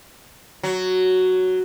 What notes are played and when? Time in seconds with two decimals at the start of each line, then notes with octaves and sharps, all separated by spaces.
0.63 F#3